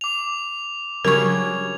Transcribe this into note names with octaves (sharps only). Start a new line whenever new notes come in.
D6 F7
C#3 F#3 G3 D4 A#4 C#6 G#6 F7